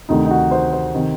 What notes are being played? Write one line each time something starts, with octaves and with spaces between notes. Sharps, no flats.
D2 C3 D#3 D#4
D#4
F#4
C5
C5
C3 D#3